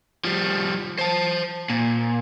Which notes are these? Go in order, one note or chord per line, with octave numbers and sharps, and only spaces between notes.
F3 G3
C5 A5
A#2